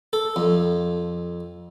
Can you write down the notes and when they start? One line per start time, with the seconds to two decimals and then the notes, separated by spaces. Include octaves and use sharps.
0.13 A4
0.36 F2